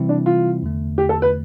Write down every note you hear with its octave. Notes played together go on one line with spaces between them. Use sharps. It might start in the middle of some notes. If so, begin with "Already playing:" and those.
Already playing: C3 E3 G3 C4 E4
D4
F4
E2 D3 A3
G4
A4
B4